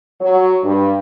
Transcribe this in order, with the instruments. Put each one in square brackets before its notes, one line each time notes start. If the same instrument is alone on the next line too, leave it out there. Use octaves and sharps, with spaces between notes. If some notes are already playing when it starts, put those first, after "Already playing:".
[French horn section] F#3
G2